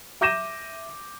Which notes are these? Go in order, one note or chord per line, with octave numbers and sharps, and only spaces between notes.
E5 D6 G6 A#6 D#7 E7